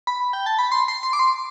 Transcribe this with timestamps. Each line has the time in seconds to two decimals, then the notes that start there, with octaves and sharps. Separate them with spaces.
0.07 B5
0.33 G5
0.46 A5
0.59 B5
0.72 C6
0.88 C6
1.03 C6
1.13 D6
1.19 C6